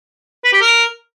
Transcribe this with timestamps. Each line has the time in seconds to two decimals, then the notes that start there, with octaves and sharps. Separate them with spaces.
0.44 B4
0.53 G4
0.62 A#4